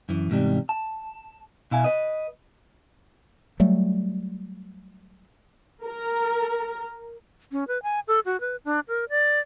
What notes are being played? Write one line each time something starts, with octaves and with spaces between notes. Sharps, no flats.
F#2 E3
E2 G#2 C3 G3
A5
B2 E4 F5 G#5
B4 D#5
F#3 G3 A3
A#4
C#4
B4
G#5
A4
F#4
B4
D4
A#4
D5